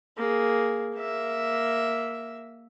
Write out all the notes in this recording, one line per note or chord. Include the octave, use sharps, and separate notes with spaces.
A#3 G#4
A#3 E5